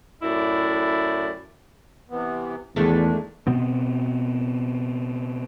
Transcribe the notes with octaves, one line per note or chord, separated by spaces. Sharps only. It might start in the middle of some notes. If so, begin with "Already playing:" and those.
F#2 A2 E4 D5
C3 E3 B3
E2 D#3 G#3 A3 D4
B2 B3 C4